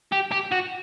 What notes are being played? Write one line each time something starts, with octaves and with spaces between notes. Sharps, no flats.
G4
G4
F#4